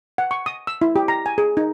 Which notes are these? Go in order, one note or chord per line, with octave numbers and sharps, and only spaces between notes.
F#5
C#6
D#6
E6
E4
G4
A#5
G#5
G#4
D#4